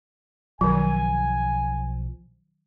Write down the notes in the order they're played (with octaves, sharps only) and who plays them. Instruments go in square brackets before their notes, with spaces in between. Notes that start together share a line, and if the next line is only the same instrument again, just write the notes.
[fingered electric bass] B1 F3 [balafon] D#3 F#3 [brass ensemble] G#5